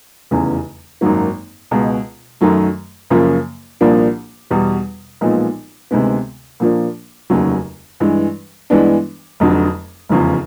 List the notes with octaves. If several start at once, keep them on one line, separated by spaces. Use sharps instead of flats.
F1 E2 C#3 E3
G#1 F#2 D#3 F#3 A#3
C#2 B2 G#3
F#2 D#3 F#3 A3
F#2 C#3 F3 A#3
C2 A#2 F3 A#3 D4
E2 B2 G3
B1 A#2 F3 G#3 B3
D2 C3 D#3 G#3 B3
A#2 F3 A#3 D4
F1 D#2 C#3 F#3
G2 E3 G#3
G2 E3 G#3 B3 D4
F1 F2 D3 F#3
F1 E2 C#3 F3